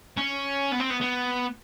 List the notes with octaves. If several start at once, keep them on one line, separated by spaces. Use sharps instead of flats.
C#4
B3
C4
B3
B3